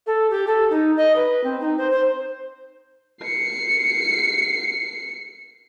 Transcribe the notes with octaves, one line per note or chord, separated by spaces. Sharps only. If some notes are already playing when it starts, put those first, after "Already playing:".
A4
G4
A4
D#4
D#5
B4
C4
D#4
C5
C5
C7 C#7